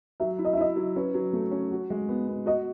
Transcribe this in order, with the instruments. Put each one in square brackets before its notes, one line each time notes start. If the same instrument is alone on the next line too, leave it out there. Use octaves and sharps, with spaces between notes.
[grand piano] F#3 [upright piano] E5
[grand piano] E4
[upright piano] D#5
E5
[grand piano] E4 [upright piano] D#5
[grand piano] F#3
[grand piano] C#4 [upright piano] B4
[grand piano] F#3
A3
C#4
F#4
G#3
B3
B3
[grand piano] F#4 [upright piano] D#5